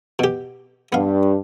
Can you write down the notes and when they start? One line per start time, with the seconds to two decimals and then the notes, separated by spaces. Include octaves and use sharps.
0.19 B2 G4
0.92 G2 B3 F5